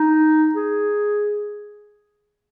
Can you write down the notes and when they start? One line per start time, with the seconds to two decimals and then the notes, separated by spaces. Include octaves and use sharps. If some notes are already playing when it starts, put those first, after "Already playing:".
Already playing: D#4
0.55 G#4